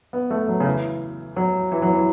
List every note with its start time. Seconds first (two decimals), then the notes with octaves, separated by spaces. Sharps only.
0.13 B3
0.31 A3
0.48 F#3
0.60 C#3
0.66 E3
1.36 F#3
1.72 E3
1.82 F#3
1.93 E3